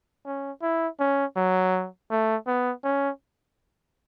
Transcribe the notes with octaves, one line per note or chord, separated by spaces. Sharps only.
C#4
E4
C#4
F#3
A3
B3
C#4